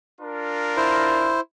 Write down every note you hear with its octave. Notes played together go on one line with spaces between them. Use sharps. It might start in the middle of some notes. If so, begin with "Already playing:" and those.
D4 F4 A#4
E4 C5